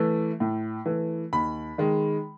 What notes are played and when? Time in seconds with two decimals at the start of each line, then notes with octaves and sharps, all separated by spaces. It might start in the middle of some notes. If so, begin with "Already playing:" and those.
Already playing: E3 A3
0.40 A2
0.86 E3 A3
1.33 D#2 B5
1.78 D#3 G#3